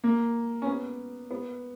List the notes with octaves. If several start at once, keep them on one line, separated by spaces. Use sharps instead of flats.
A#3
C#4
B3
B3